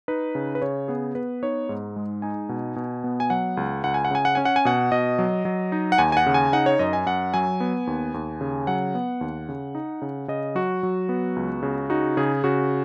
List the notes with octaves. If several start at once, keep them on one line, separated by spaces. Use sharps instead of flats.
D#4 B4
C#3
B4
C#3 C#5
B3 G#4
B3 B4
D#4 C#5
G#2
G#3
D#4 G#5
B2
B2
B3
G#5
F#3 F#5
C#2
C#2 F#5
G#5
F#5
C#3 G#5
F#5
C#4 G#5
F#5
G#5
B2 F#5
B2 D#5
F#3
F#3
D#4
F#5
D#2 G#5
G#5
F#5
C#3
G#5
D#4 F#5
C#5
F#2 D#5
G#5
F#2 F#5
F#3 G#5
B3
D#2
D#2
C#3
F#3 F#5
B3
D#2
C#3
D#4
C#3
C#3 D#5
F#3 F#4
F#3
B3
C#2
C#3
D#4 F#4
C#3 G#4
C#3 F#4